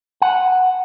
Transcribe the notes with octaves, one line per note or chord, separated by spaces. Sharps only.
F#5